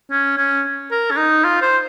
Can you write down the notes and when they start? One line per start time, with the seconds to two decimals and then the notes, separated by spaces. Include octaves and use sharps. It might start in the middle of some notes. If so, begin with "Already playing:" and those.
0.11 C#4
0.37 C#4
0.91 A#4
1.11 C#4
1.17 D#4
1.44 F4
1.62 C5